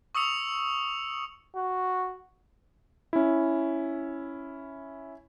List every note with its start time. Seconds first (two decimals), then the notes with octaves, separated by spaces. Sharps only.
0.15 C#6 D#6 E6 C#7 F7
1.56 F#4
3.13 C#4 E4